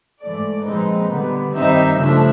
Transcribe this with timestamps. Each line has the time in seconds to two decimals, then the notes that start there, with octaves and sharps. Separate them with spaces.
0.21 G#2 E3 A3 D5
0.66 A#2 F3 G#3 C4 D#4 B4
1.10 D3 G3 B3
1.54 G2 D#3 G3 C4 D#4 E5
1.98 C#3 F3 A3 D4 E5